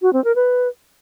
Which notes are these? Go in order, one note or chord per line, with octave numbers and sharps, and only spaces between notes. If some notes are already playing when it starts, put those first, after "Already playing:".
F#4
C4
A#4
B4